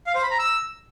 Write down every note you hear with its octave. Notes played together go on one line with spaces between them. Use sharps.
F5
C5
B5
A#5
E6